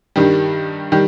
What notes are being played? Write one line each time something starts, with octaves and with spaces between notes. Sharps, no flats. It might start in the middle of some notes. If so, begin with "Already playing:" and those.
G2 D#3 G3
D#3 G3